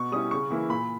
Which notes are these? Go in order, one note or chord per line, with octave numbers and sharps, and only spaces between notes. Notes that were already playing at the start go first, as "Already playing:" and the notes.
Already playing: B2 C#6
G3 C#4 E4 D#6
C#3 C#6
E3 A#3 E4
A#2 B5